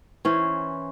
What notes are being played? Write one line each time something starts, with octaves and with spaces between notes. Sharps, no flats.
E3 C#4 C5